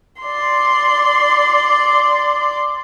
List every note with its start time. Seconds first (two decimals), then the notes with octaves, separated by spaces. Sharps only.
0.22 D5 C6